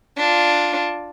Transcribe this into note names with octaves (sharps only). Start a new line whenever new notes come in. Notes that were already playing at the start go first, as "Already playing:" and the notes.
D4 F4